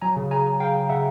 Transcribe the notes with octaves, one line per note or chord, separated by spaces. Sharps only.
F#3 G#5 A#5
C#3
C#3 G#5 A#5
C#3
C#3 F5 G5
C#3
C#3 E5 F#5